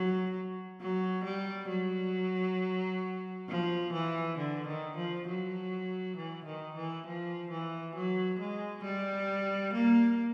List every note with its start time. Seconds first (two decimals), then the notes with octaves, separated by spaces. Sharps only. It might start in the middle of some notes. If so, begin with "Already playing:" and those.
Already playing: F#3
0.80 F#3
1.24 G3
1.69 F#3
3.48 F3
3.93 E3
4.38 D3
4.67 D#3
4.96 F3
5.27 F#3
6.17 E3
6.45 D#3
6.76 E3
7.06 F3
7.51 E3
7.95 F#3
8.39 G#3
8.83 G3
9.73 A#3